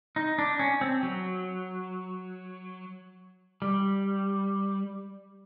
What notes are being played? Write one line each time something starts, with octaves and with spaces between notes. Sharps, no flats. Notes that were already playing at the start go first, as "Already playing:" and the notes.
D#4
D4
C#4
C4
F#3
G3